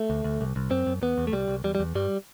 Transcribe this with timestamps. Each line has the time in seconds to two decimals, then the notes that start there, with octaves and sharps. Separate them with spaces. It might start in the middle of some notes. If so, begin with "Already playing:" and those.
Already playing: A3
0.10 D2
0.25 D2
0.41 C2
0.56 C2
0.71 F#2 C4
0.87 F#2
1.02 E2 B3
1.18 E2
1.27 A3
1.32 C2 G3
1.48 C2
1.64 E2 G3
1.75 G3
1.80 E2
1.95 G2 G3